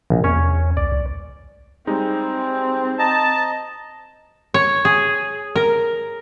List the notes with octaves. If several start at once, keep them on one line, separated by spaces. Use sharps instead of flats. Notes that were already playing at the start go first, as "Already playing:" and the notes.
A#1 B2
E2 C#4 C#5
C2 D5
C2
G3 G#3 C4 D#4
D#5 A5 A#5
C#5
G#4
A#4